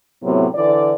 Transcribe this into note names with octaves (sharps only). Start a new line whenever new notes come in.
A2 C3 F#3 B3
D3 E3 D5